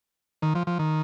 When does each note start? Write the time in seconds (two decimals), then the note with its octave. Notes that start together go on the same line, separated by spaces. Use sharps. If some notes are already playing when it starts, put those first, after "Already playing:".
0.42 D#3
0.55 F3
0.67 F3
0.79 D#3